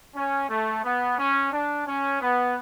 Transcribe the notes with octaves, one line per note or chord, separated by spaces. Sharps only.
C#4
A3
B3
C#4
D4
C#4
B3